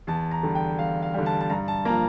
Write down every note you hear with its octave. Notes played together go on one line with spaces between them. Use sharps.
E2 A5
A#5
D3 G3
G5
E2 F5
F5
D3 G3
A5
A5
G2 A#5
A5
F3 A#3 A#5